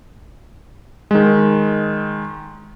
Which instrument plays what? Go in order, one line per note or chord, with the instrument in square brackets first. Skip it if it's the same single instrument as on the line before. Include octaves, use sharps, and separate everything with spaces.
[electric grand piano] D#3 G#3